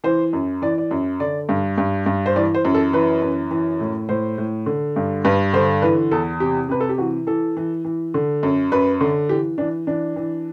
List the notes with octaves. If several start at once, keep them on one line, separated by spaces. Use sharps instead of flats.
E3 C5
F#2
E3 D5
D5
F#2
D3 D5
G2
G2
G2
C5
E3 D5
C5
F#2
A4
E3 B4
F#2
E3
A2
A2 C5
A2
D3
G2
G2 B4
D3 C5
E3 B4
E2 A4
C3 G4
C3 B4
A4
G4
E3 F#4
E3 A4
E3
E3
D3
F#2
F#2 B4
D3
E3 G4
E3 D4
E3 D4
E3